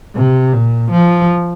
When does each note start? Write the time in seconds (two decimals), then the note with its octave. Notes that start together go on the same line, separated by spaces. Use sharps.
0.15 C3
0.53 A#2
0.91 F3